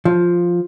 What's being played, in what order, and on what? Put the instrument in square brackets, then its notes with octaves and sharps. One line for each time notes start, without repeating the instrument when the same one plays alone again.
[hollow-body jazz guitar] F3